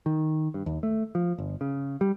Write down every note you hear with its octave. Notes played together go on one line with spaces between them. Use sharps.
D#3
G2
D#2
A3
F3
G1
C#3
G3